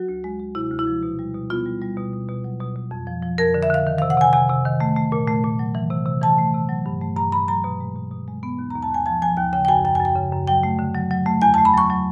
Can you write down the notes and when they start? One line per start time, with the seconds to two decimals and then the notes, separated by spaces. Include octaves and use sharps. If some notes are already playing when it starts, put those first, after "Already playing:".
Already playing: F#3 F#4
0.09 D2
0.24 G#3
0.40 G#3
0.55 C3 E4
0.72 D2
0.79 E4
0.87 F3
1.03 B2
1.19 G3
1.34 B2
1.50 B3 F4
1.66 G3
1.82 G3
1.97 B2
2.13 B2
2.28 B2
2.44 F#3
2.61 B2
2.75 B2
2.91 F2
3.07 F3
3.23 F3
3.38 F2 A#4
3.54 D3
3.63 E5
3.70 D3 F5
3.87 D#3
3.98 F5
4.02 C3
4.10 F#5
4.17 C3 G#5
4.33 C3 G#5
4.49 C3
4.65 D#3
4.80 A3
4.96 A3
5.12 A#2
5.28 A3
5.44 A#2
5.59 F#3
5.75 E3
5.90 C3
6.06 C3
6.22 E3 A5
6.38 A3
6.54 C3
6.69 F#3
6.86 G2
7.01 A3
7.16 G2 A#5
7.32 G2 B5
7.48 F#3 A#5
7.64 B2
7.80 G#3
7.96 B2
8.11 B2
8.28 G#3
8.43 B3
8.59 D#2
8.70 A#5
8.75 D#2
8.82 A5
8.90 D#2 G#5
9.06 F3 A5
9.22 F3 G#5
9.37 D#2 G5
9.53 C#3 G5
9.65 G5
9.68 F#2 G#5
9.84 F#2 G5
9.95 G#5
10.00 F#2 G5
10.16 C#3
10.32 F#2
10.47 F#3 G5
10.63 A3
10.79 D3
10.95 F#3
11.11 F#3
11.26 A3
11.42 E2 G#5
11.54 A5
11.58 A3
11.65 B5
11.74 F#3 C#6
11.90 F#3